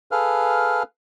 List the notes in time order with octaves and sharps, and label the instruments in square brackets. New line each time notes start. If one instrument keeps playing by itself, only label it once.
[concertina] G#4 A4 B4 F5 F6